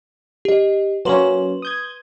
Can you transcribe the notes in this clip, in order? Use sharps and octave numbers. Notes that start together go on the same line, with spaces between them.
G4 D#5
F#3 A#3 C#4 B4 C6 F#7
D#6 G6 G#6